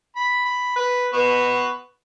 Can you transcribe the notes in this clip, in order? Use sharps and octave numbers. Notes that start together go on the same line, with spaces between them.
B5
B5
B4
B3 B4 C#6